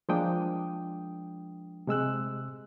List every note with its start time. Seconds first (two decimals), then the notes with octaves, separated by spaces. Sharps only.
0.09 F3 G#3 A#3 D4 G5 D#6
1.87 C3 G#3 E6 F#6